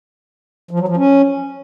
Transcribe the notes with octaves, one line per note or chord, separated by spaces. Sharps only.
F3
F#3
F3
C#4